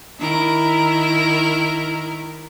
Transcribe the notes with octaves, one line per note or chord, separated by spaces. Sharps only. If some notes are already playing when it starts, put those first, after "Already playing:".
D#3 E4 A#4